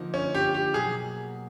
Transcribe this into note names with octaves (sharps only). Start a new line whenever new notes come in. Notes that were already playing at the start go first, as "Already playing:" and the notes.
Already playing: D3 F3 A#3 D#4
C#4
G4
G4
B2 F#3 A#3 G#4